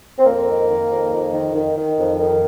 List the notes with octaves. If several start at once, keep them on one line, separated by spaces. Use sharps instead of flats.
C4
F2 A#3
D#3
D#3
F2
F2
D#3
D#3
D#3
F2
D#3